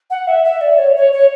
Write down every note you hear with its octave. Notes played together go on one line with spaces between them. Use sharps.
F#5
E5
E5
D5
C#5
C#5
C#5